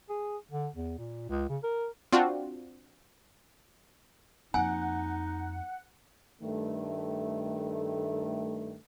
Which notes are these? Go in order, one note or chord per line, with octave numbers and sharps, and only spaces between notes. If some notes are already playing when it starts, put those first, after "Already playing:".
G#4
D3
E2
A#2
C#2
C#3
A#4
C4 D4 F4 F#4
F2 A#3 D#4 F#5 G#5
G2 D#3 A3